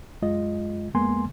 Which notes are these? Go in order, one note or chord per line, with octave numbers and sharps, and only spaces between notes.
F#2 G#3 F4 D#5
F2 G#3 A#3 B3 G#5 C6